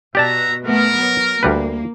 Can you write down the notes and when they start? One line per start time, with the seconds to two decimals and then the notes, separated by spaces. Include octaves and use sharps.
0.15 B2 G4 D5 E5 F#5 A5 A#5
0.64 A3 B3 A#4
0.99 F#3
1.43 D2 G3 A#3 B4